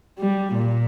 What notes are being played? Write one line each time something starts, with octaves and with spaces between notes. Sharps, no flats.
G3
A#2